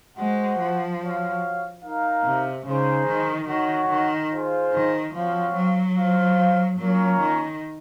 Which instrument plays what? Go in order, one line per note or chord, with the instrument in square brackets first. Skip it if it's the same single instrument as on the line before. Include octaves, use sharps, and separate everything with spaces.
[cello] G#3 [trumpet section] F#4 C5 F#5
[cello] F3
[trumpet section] F#4 C#5 F5
D#4 A#4 F5
[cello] C3
[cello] C#3 [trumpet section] G#3 D#4 G#4 C5
[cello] D#3
[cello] D#3 [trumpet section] F#4 C#5 F#5
[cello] D#3
[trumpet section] F4 G#4 C5 F5
[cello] D#3
[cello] F3 [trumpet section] C4 F#4 C#5 F5
[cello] F#3
[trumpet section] F4 C5 F5
[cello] F#3 [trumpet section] A#3 C#4 F4 A#4 C#5
[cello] D#3